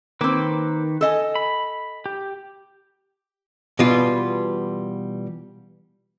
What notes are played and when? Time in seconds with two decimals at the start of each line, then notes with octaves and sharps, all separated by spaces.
0.21 D#3 A#3 C4 B4 D6
1.01 A4 D#5 G#5
1.35 B5
2.06 G4
3.79 B2 E3 G3 B3 F4 D5